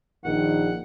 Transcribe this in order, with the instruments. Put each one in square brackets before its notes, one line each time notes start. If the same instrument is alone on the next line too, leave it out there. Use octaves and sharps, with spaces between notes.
[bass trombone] A#1 [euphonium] D#3 [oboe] F#5